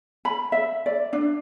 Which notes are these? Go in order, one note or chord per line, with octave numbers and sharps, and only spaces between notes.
B5
E5
D5
D4